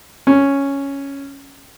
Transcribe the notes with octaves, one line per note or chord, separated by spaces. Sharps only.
C#4